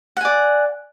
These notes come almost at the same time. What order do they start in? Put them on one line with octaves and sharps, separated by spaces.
F#5 G#5 D5